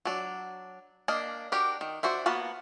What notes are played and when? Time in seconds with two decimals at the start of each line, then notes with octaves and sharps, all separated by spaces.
0.05 F#3 D4
1.08 A#3 D4 D#5 F5
1.52 D4 F#4 G4 A#4
1.81 D#3
2.03 D4 F#4 C5 E5
2.26 A#3 B3 F#4 A5 B5